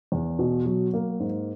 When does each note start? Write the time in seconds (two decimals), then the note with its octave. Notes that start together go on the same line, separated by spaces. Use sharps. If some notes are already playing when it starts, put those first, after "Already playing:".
0.12 E2
0.39 B2
0.66 F#3
0.94 A#3
1.20 G#2